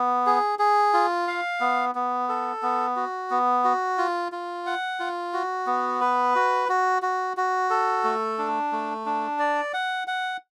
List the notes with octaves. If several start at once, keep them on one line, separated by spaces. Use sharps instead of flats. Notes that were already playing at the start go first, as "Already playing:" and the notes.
Already playing: B3
G#4
G#4
F4
F5
B3
B3
A4
B3
F#4
B3
F#4
F4
F4
F#5
F4
F#4
B3
B4
F#4
F#4
F#4
F#4
A4
A3
D4
A3
D4
D5
F#5
F#5